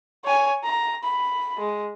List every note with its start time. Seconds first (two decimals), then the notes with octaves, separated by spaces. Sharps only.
0.24 C#5 G#5
0.64 A#5
1.03 B5
1.57 G#3